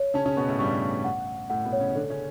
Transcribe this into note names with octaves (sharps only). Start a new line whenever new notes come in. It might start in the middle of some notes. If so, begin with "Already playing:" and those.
Already playing: C#5
C#3 C#4 A5
C#3 C#4
B2 B3 C#6
A2 A3
G2 G3 C#6
C#6
F#5
F#5
A2 A3 F#5
B2 B3
C#5
C#3 C#4
D3 D4 A4
C#3 C#4